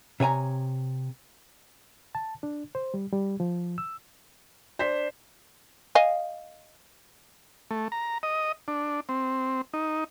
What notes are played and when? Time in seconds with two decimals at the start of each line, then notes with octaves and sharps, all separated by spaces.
0.20 C3 C#5 G#5 A#5
2.15 A5
2.43 D4
2.75 C5
2.94 G3
3.12 G3
3.40 F3
3.78 E6
4.79 D4 C5 B6
5.95 D#5 F5 G#5
7.71 A3
7.92 A#5
8.23 D#5
8.68 D4
9.09 C4
9.74 D#4